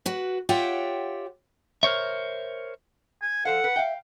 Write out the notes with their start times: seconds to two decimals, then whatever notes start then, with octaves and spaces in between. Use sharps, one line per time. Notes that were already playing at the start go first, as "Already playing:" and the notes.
0.06 F#4 B4
0.49 F4 G4 C#5 E5 F#5 G5
1.83 A#4 C5 C#5 E5
3.22 G#5
3.45 F3 A4 C5 F5 F#5
3.64 B4
3.76 E5 F5 G5